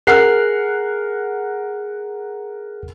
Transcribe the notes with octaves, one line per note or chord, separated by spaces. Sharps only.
G#4 A#4 F#5 F6 F#6 C7